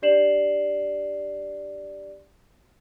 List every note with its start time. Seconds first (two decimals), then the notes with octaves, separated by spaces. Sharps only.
0.02 D4 G4 D5 C7 E7 F#7